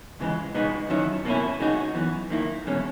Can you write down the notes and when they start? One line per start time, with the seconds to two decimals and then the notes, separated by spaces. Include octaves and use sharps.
0.20 C#2 C#3 E3 G#3
0.54 C#2 B2 G#3 B3 D#4
0.90 D#3 F#3 C#4 E4
1.25 B2 A#3 C#4 E4
1.60 C#3 G#3 D#4 F#4
1.95 F#2 E3 B3
2.30 D#3 A#3 E4
2.66 E2 B2 G#3 C#4